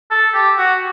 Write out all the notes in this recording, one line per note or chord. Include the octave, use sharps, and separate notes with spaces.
A4
G4
F#4